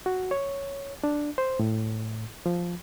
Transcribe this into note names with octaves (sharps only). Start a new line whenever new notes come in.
F#4
C#5
D4
C5
A2
F3